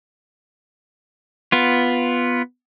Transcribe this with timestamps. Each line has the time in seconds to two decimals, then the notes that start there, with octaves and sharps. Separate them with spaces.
1.52 B3 F4